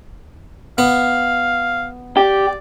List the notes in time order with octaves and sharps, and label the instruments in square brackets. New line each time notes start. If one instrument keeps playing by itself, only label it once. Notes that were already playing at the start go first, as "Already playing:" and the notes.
[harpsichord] B3 [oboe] F5
[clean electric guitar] G4 [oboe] D5